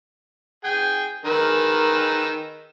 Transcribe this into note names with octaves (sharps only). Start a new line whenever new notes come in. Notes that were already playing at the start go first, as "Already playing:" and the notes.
G#4 G5 G#5
D#3 G#4 A#4 B4 E6